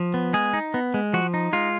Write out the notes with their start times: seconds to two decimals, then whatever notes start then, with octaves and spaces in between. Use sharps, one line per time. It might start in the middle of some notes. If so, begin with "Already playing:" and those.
Already playing: F3
0.14 B3
0.33 G#3 G#4
0.53 D#4
0.74 B3
0.94 G#3
1.13 F3 F#4
1.34 D#4
1.53 G#3 F4